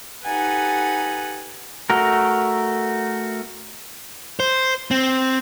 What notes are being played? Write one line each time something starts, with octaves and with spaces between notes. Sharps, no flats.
D#4 G4 A4 B4 F#5 G#5
A3 F#4 A#4
C5
C4